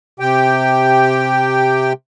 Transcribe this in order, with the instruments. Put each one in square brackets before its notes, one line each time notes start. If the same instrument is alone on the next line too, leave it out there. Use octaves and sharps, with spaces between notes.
[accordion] C3 G4 G5